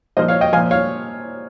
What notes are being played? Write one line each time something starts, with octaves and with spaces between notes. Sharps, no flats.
A#2 F3 C5 D#5
C#5 F5
D#5 G5
A#2 F3 F5 G#5
C#5 F5